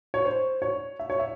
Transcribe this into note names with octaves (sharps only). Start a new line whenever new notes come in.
C#5
C5
C#5
E5
C#5
E5